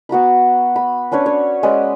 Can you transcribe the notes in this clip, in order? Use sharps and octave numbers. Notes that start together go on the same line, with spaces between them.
B3 F#4 A#5 B5
B5
C#4 D4 B4 C#5
C#5
G#3 C#4 B4 D5